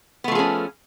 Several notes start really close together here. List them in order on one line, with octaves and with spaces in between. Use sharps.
B3 A3 F3 G#4 C#4